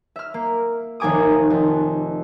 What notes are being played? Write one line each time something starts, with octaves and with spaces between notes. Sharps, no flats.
E5 F6
A#3
F1 D#2 A#4 G#5 D6 D#6
F2